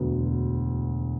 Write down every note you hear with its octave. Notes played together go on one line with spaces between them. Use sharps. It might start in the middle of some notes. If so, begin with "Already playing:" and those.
Already playing: E1 D2 D3 F#3 B3